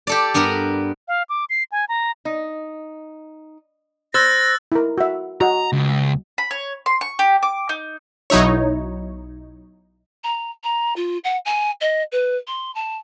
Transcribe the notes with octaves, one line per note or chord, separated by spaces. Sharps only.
G4 A4 D5
G2 B3 A#4 A#5
F5
D6
C7
G#5
A#5
D#4
C5 E6 F#6 A6 A#6
E4 A#4
F#4 E5
F#4 D#5 A#5
C#2
B5
C#5
C6
C#6
G4
D6
D#4
B1 F#3 D#4 E4 C#5
A#5
A#5
F4
F#5
G#5
D#5
B4
C6
A5